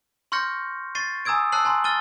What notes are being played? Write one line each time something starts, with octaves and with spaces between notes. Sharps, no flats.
C6 C#6 F6 G6 A#6 C#7
C#6 A6 C7 D#7
G#5 A#5 D#6 E6 G#6 D7
A5 E6 F#6 C7 F#7
G#5 A#5 C6
F6 A6 D#7 G7